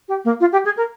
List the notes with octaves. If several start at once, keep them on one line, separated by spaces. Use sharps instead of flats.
G4
A#3
F4
G4
G#4
A#4